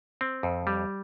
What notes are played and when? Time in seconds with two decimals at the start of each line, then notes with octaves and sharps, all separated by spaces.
0.21 C4
0.43 F2
0.67 G3